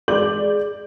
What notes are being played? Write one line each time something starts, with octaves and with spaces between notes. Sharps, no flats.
G#3 D5 D6 G6 F#7